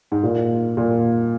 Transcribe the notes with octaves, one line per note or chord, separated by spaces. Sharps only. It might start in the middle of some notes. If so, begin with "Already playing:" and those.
G#2
A#2
A#2